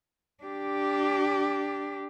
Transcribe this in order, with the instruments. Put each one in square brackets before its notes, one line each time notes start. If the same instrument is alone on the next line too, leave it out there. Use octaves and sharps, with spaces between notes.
[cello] D4 G4